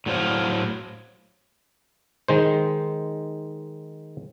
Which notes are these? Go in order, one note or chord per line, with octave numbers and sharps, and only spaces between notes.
A2 F#3 C5 F5
D#3 G#3 C5